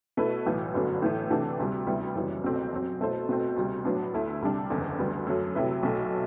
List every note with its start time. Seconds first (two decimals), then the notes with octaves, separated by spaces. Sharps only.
0.17 B2 A3 E4 B4
0.46 B1 A2 E3
0.74 G1 F#2 D3 F#3 B3
1.02 A2 E3 A3
1.30 C3 E3 A3 D4 F#4
1.59 D2 C3 G3
1.87 D2 C3 G3 B3 E4
2.15 F#1 F#2 E3 G3
2.44 C2 B2 A3 C4
2.72 F#2 F#3 C4
3.00 B2 A3 E4 A4 C5
3.29 B2 A3 C4
3.57 D2 C3 G3
3.85 A2 F#3 B3 D4
4.14 D2 D3 A3 E4
4.42 C2 C3 G3 D4
4.70 F#1 E2 D3
4.99 D2 D3 G3 B3
5.27 F#2 F#3 A3
5.55 C3 F#3 A3 E4 B4
5.83 B1 B2 F#3 A3